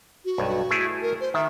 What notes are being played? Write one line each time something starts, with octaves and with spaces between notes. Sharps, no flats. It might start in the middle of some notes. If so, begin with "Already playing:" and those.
F#4
B1 G2
A3 E4 G#4
A#4
C5
D#3 E5